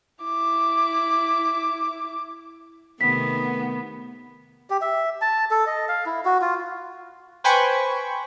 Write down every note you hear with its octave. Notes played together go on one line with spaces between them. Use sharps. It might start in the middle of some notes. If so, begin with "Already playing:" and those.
E4 D6
C3 D#3 A3 B3 B6
G4
E5
A5
A4
D#5
F5
E4
F#4
F4
B4 C5 G5 G#5 B5 C#6